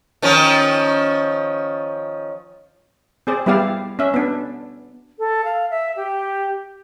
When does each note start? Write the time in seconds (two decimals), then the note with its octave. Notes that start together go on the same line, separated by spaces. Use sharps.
0.22 D#3 F3 C#4
3.27 C4 G#4 D5
3.46 G3 B3 E4 G4 D5 F5
3.99 C#4 E5
4.14 B3 D4
5.18 A4
5.44 F5
5.70 E5
5.96 G4